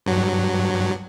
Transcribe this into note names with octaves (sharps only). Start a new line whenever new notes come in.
G2 F#3